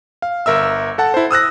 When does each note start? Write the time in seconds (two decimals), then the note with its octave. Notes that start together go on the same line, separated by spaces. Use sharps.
0.22 F5
0.46 G1 A#4 E5 E6
0.98 A4 F#5 A5
1.14 E4 C5
1.31 D#6 E6 F#6 A#6